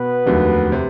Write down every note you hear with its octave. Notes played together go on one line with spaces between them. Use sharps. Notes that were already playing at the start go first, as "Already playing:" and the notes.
Already playing: B2 B3 B4
F1 D#2 D3 F#3 A3
C3